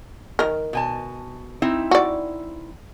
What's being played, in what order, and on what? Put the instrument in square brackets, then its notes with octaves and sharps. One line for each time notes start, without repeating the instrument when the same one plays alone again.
[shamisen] D#3 A#4
[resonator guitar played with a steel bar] B2 G#5 A5
C4 D#4 E4
[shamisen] F#4 D5